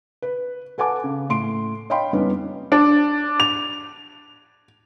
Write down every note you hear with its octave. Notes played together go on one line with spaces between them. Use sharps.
B4
A4 B4 F#5 G#5 A5 D6
C#3
A2 C6 D7
C#5 D#5 F5 G5 B5 C6
F2 G3 B3 C#4 D#4
D4
F7